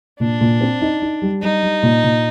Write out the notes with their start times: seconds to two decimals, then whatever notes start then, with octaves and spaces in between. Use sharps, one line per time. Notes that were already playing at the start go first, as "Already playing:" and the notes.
0.20 A#2 D4
0.41 A#2
0.61 C4
0.81 D#4
1.02 D#4
1.22 G3
1.42 G3 D#4
1.63 G3
1.83 A#2
2.04 A#2